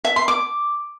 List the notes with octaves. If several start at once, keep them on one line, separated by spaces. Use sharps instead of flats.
E5
C6
D6